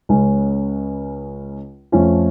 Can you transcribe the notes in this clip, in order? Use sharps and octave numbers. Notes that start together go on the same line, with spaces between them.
C#2 C#3 G#3 C#4
F2 F3 A3 C#4 F4